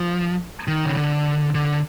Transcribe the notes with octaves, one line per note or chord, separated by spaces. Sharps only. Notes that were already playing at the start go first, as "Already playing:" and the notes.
Already playing: F3
D#3
C#3
D3
D3